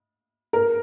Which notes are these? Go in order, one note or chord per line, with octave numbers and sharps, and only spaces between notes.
A#4